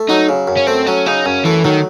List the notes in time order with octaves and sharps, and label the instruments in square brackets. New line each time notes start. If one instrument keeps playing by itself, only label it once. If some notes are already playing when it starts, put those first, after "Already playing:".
Already playing: [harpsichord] A3
[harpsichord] F#3 [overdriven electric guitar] D#4
[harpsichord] C#3
F#2
[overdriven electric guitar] C#4
[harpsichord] A3 [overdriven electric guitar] C4
[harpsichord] F#3 [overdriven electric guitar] C#4
[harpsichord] C#3 [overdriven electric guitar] D#4
[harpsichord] F#2 [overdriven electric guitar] C#4
[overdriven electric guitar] E3 [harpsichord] A3
[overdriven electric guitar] D#3 [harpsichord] F#3